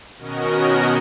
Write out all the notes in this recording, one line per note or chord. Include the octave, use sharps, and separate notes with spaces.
B2 D#3 C#4 F#4 A#4 D#5